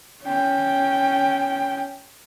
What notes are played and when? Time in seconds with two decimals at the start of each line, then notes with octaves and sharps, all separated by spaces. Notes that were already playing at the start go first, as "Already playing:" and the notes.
0.24 C#4 G5